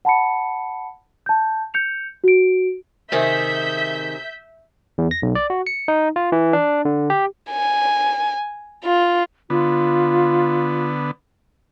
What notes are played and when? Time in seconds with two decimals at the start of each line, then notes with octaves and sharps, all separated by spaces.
0.05 F#5 A5 B5 C#7
1.26 A5 G6
1.74 G6 C#7 F7
2.24 F#4 D7
3.12 C3 D#3 G#4 E5 G6 B6
4.98 E2
5.11 A#6
5.22 B1
5.35 D5
5.50 F#4
5.67 C#7
5.88 D#4
6.16 F4
6.32 E3
6.53 D4
6.85 D3
7.10 G4
7.51 G#5
8.84 F4
9.50 D3 B3 F4